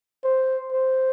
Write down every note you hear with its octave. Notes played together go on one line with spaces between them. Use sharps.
C5
C5